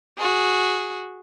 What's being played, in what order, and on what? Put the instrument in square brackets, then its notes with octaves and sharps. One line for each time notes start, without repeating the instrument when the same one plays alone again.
[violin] F#4 G#4